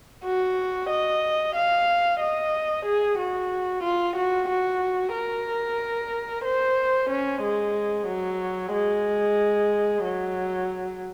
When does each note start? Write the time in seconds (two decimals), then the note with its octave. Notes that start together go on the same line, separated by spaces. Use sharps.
0.25 F#4
0.90 D#5
1.55 F5
2.20 D#5
2.86 G#4
3.18 F#4
3.84 F4
4.16 F#4
4.49 F#4
5.14 A#4
6.44 C5
7.10 C#4
7.42 G#3
8.08 F#3
8.73 G#3
10.04 F#3